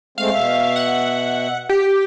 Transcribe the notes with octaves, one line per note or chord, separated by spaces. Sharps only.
G#3 A3 C4 F5
B2 E5
F#5
G4